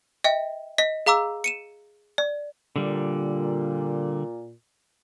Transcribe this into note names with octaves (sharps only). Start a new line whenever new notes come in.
D#5 E5 G5
D#5 B6
G#4 F5 A#5 D6 E6
C#7 D#7 E7
D5
A#2 D3 G3